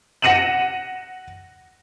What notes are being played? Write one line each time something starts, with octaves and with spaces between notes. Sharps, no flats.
F#5 A#6 C#7 D#7 E7 F#7